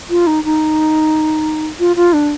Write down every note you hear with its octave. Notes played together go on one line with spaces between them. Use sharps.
F4
D#4
D#4
F4
F4
D4